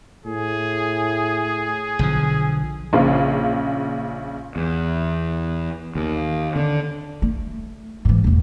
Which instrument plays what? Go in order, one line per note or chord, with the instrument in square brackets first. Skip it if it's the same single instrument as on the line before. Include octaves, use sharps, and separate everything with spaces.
[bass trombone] A2 [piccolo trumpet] G#4
[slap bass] B1 D3 F3
[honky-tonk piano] A#1 C#3 F5
[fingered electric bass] E2
D#2
D3
[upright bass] A3
G#2 E3
E1 E2